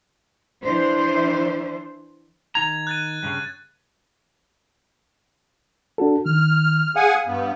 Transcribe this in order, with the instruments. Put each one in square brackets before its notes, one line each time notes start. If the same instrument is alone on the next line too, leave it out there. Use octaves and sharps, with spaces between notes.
[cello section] E3 D4 C5
[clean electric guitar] D#3 D#4 A#5 [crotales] G#6
[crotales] F#6 A6 D#7
[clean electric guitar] G2 A#2 C#3
[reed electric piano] D4 F#4 A4
[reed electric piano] D#3 [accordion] F6
[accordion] G#4 F#5 G#5 [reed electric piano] F5
[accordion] G2 B3